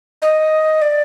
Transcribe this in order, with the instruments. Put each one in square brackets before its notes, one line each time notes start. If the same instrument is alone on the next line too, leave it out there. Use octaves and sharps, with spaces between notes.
[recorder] D#5
D5